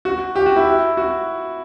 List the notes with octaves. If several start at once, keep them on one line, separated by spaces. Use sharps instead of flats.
F#4
G4
F#4
E4
F#4